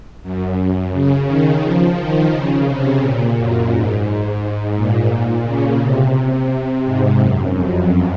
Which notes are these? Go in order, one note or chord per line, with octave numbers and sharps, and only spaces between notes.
F#2
F#2
C#3
D#3
F3
D#3
C#3
C3
A#2
F#2
G#2
A#2
A#2
C#3
C3
G#2
F#2
F2